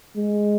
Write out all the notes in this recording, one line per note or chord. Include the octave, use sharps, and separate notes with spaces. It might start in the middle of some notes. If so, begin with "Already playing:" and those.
G#3